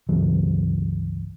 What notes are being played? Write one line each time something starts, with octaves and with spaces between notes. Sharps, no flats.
G1 C#2 E3 F#3